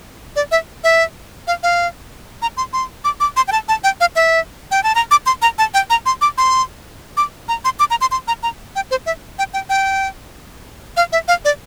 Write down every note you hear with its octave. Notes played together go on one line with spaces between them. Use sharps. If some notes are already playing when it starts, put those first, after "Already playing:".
D5
E5
E5
F5
F5
A#5
C6
C6
D6
D6
C6
G5
A5
A5
G5
F5
E5
G5
A5
A#5
D6
C6
A#5
A5
G5
A#5
C6
D6
C6
D6
A#5
C6
D6
A#5
C6
C6
A#5
A#5
G5
C5
E5
G5
G5
G5
F5
E5
F5
D5